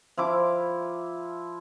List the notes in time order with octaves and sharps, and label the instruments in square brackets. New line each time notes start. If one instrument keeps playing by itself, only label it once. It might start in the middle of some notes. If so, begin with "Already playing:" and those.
[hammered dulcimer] F3 E4 D6